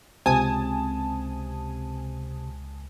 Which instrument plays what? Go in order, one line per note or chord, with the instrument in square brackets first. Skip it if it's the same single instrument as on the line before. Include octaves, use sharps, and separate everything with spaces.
[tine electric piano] C#2 [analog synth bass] C3 [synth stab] G#5 D#6 [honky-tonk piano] A5